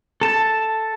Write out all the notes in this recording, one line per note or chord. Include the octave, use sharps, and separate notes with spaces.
A4 A5